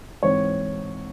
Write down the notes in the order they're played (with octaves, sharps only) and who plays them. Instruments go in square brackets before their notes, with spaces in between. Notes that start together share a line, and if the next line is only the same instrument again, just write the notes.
[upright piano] G#2 E3 C4 C#5